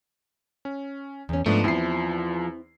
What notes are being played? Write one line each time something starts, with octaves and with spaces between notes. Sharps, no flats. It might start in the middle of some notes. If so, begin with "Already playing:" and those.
C#4
E2 C#4
G#2 F3 A3 B3 D4
E2 C4 E4 C7